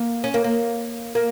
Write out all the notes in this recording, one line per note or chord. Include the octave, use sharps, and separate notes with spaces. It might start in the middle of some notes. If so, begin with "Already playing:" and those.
Already playing: A#3
C#4
A#3
A#3
A#3